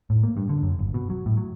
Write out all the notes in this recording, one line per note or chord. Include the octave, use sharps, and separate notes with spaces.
A2
A#3
G2
D3
F#2
G1
B2
F#3
A2
F#3